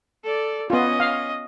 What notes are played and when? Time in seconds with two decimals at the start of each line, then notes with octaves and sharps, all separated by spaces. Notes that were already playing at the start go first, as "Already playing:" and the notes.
0.24 A4 D5
0.70 B3 C#4 F4 D#5
1.00 F5